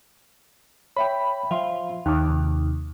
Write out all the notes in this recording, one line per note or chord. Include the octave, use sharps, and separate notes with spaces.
C#5 E5 G5 B5
F3 E5 F5 C6
D#2 G5 A5 D6
C3